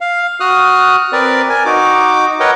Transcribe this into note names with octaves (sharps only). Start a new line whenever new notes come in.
F5
F#4 D#6 F6 F#6
C4 A#4 B4 D5
A#4 G#5
D#4 F#4 D6
A#4 B4 C#5 D#5 F#5 G5